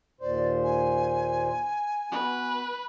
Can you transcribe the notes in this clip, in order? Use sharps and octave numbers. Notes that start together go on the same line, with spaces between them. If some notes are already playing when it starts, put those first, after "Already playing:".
D#2 A#2 C5 D5
G#5
B3 F#4 B4